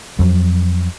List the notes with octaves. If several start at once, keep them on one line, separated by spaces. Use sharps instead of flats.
F2 F#3